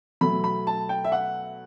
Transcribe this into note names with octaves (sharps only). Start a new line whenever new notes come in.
B2 F#3 A3 B5
B5
A5
G5
E5
F#5